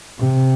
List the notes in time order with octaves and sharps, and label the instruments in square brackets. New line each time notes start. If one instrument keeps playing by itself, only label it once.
[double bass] C3